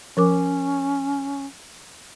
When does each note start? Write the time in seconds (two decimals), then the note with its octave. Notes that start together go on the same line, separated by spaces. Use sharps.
0.17 F3 C#4 A#4 D6